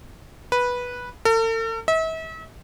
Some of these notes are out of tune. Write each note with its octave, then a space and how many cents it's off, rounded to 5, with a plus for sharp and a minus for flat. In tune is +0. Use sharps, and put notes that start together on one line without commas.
B4 -10
A4 +45
E5 -40